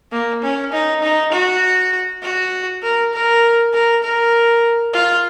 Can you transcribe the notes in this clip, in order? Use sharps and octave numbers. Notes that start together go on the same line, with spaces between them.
A#3
C#4
D#4
D#4
F#4
F#4
A#4
A#4
A#4
A#4
F4